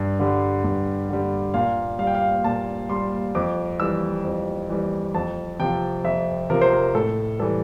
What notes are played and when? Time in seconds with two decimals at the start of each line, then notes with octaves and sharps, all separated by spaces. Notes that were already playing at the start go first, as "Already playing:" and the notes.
Already playing: G2
0.19 D3 G3
0.64 G2
1.09 D3 G3
1.54 A#2 F5
1.99 G3 F5
2.07 G5
2.15 F5
2.44 A#2 A5
2.89 G3 C6
3.35 F2 D6
3.80 E3 G3 E6
4.25 F2
4.70 E3 G3
5.14 F2 A5
5.59 C3 F3 G5
6.04 F2 E5
6.50 C3 F3 A#4
6.61 C5
6.73 A#4
6.95 A2 A4
7.40 E3 G3 A4